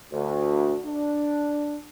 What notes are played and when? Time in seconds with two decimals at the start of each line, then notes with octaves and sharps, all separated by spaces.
0.13 D2
0.85 D4